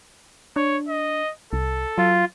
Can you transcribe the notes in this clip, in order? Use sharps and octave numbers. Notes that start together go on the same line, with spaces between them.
D4 C#5
D#5
C2 A4
F#3 F4